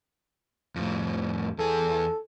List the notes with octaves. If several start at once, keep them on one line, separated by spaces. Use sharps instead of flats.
F2 A2
E2 G#4 A4